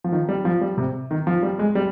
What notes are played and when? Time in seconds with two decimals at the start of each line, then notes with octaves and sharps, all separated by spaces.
0.04 F3
0.12 D#3
0.29 G3
0.45 F3
0.61 G3
0.78 C3
1.11 D#3
1.27 F3
1.43 G3
1.59 G#3
1.75 G3